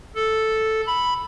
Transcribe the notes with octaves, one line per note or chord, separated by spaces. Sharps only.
A4
B5